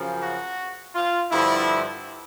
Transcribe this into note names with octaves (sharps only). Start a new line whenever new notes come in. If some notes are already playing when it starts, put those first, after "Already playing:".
Already playing: F#2 C#3 F3
F#4
F4
G2 D3 F3 E4